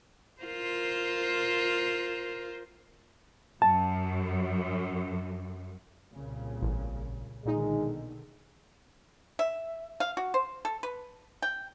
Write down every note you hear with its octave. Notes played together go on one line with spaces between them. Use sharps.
F4 A#4 C5
F#2 A5
C2 A#2 C#3
A1
B1 A#2 D3 D#3 G#3 D#4
E5
F5
F#4
C5
A4
B4
G5